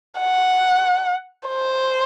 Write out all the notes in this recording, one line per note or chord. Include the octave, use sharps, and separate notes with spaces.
F#5
C5